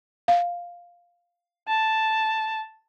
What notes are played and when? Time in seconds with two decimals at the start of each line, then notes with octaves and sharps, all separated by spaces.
0.28 F5
1.68 A5